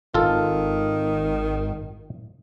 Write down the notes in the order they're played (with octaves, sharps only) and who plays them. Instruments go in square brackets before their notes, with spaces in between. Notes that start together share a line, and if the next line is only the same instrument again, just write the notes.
[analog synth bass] G#1 [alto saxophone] D#3 [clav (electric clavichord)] F4 A4